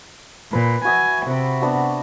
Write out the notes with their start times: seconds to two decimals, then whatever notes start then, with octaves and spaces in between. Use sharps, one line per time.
0.53 A#2 B4
0.85 F#4 E5 G#5 D#6
1.26 C3 F#5 B5
1.61 B3 D4 F#4